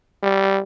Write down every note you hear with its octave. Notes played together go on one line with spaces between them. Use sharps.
G3